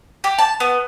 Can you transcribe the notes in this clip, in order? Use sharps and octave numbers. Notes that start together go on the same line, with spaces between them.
G4
A5
B3